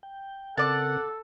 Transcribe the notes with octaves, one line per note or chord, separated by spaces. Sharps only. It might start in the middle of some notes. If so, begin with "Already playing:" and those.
G5
C#3 C4 A4 A#4 D5 F#5 A5